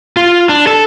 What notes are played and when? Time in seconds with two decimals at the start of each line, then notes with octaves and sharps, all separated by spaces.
0.17 F4
0.49 D4
0.67 A4